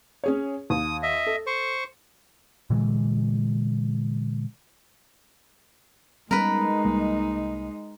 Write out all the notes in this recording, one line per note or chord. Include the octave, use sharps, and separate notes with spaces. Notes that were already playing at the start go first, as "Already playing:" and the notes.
C#4 G#4 C#5
D#2 D#6
D#5 E5
A4
C5 C#6
A#2 D3 E3 G#3
G3 G#3 B3 C#4 D#4 A#4 B4
C2 G3 A#3